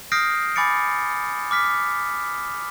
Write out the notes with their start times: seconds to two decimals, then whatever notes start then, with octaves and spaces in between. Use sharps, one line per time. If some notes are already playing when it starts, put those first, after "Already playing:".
0.12 D#6 F6 G6 A#6 C7 D7
0.55 G#5 B5 D6 A6 C#7 D7
1.51 D6 F6 B6